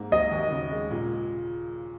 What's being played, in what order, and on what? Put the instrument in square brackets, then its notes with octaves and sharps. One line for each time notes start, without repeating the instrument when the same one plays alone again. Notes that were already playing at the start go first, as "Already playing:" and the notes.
Already playing: [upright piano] G#2 A#3
[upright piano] F#3 [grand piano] D#5
[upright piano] D#2
C#3
G#3
A#2